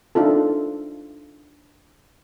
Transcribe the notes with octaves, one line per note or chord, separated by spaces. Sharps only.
D4 D#4 F4 A4